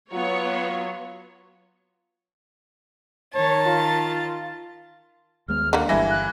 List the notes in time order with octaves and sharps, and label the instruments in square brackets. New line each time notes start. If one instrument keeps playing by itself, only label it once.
[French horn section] F#3 F4 [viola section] B3 C#5
[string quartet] D#3 A5 A6 [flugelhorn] C#5
[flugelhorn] F4
[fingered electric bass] D#2 G#3 B3 [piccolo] F6
[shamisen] D3 A#3 [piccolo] F#5
[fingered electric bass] G1 G3 [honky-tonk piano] E3 E4 A#6
[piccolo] F#6